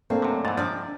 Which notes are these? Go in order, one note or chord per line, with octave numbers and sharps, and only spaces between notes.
A3 A#3 C4 D4
F#2 C3
G#2 E3 D#5 A6
C3 F3 D4 D5